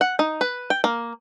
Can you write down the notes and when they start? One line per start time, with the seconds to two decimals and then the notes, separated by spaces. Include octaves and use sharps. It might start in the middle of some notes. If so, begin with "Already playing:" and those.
0.01 F#5
0.19 D#4
0.41 B4
0.70 G5
0.84 A#3